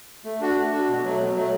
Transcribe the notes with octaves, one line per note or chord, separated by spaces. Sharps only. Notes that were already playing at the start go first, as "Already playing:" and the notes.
A3
D4 F#4
A3
D4 F#4
B2
F#3 A3
B2
F#3 A3